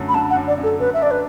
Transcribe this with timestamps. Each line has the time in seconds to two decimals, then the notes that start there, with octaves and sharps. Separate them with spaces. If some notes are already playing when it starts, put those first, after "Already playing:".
Already playing: F#2 D3 A3
0.09 B5
0.14 D3 A5
0.30 F#5
0.36 F#2
0.47 D5
0.58 F#2
0.63 A4
0.80 F#2 B4
0.94 E5
1.01 D4 D5
1.11 B4